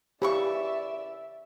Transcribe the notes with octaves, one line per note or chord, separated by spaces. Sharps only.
C#3 E3 G4 D5 E5 C#6